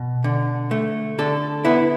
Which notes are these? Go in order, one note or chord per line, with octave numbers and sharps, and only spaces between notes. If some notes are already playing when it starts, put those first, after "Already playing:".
Already playing: B2
D3
A3
D3 A4
B3 E4